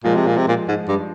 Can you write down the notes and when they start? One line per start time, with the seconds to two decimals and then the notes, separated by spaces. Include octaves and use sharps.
0.04 A#2 F3 G#3
0.15 C3
0.26 A#2
0.37 C3
0.48 A#2
0.68 G#2
0.88 G2